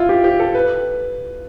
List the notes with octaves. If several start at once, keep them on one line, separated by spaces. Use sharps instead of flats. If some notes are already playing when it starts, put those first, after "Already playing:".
Already playing: E4 F4
G4
G4
A4
B4